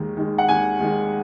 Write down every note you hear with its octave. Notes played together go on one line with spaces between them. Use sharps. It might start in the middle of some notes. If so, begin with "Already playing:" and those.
Already playing: D#2 D#3 G#3
D#3 G#3
F#5
D#2 G#5
D#3 G#3